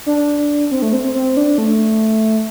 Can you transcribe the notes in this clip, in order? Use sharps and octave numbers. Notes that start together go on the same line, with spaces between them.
D4
C4
A3
C4
C4
C4
D4
A3